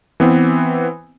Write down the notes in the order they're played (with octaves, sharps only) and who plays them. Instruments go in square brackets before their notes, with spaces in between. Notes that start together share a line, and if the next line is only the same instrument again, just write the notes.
[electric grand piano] E3 B3 C4